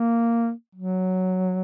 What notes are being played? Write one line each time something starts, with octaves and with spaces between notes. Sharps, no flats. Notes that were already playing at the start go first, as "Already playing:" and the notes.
Already playing: A#3
F#3